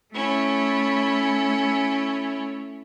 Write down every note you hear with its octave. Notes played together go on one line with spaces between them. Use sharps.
A3 C#4 E4